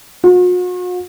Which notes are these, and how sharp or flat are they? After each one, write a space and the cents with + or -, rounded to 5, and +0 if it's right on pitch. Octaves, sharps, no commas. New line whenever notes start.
F#4 -45